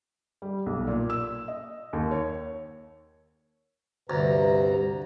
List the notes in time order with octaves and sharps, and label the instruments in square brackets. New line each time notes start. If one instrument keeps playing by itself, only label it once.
[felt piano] G3
B1
A#2
E6
D#5
D#2
C#5
[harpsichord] D2 [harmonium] G2 C3 A#5 [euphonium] B4